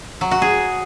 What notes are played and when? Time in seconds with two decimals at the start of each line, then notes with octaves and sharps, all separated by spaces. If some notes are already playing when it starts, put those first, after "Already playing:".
0.21 F#3
0.31 F#4
0.42 G#4